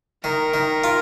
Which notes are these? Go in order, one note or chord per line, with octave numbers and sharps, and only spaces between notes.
D#3 A#4
D#3
F4